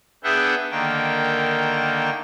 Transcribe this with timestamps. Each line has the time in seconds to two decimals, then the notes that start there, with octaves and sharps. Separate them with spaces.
0.24 B3 D4 G#4 E5 F#5 G5
0.71 D3 D#3 A#3 G5